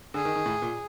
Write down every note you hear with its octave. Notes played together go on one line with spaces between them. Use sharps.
D3 G#4
D#3
D#3
A2
A#2